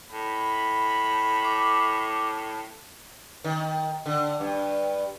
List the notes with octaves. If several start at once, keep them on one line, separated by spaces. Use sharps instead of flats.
A2 B5
D6
D#3
D3
G2